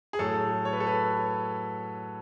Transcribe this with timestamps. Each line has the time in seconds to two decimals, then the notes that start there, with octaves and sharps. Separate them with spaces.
0.13 G#4
0.19 A2 F#3 A4
0.65 C#5
0.73 B4
0.80 A4
0.87 B4